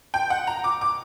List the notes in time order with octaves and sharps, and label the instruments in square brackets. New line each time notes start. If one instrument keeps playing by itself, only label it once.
[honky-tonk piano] G5
F#5
A#5
D6
D6